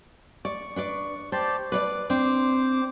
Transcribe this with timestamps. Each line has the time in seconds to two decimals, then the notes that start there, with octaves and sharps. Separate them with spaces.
0.45 D5 C#6
0.76 D4 B4 D5
1.32 G4 C5 D5 A5
1.72 B4 C#5 D5 D6
2.10 C4 D4 C5 D6